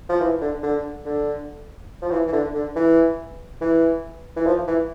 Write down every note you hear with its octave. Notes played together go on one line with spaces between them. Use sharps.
F3
E3
D3
D3
D3
F3
E3
E3
D3
D3
E3
E3
E3
F3
E3